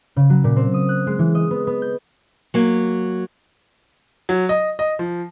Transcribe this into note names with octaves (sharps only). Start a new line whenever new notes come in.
C#3
F#3
A#2
C4
D#6
F#6
G#3
E3
D#5
B3
B3
G6
F#3 A#3
F#3
D#5
D#5
F3